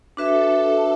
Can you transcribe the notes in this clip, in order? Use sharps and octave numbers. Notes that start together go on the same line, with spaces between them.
D4 F#4 A4 B4 E5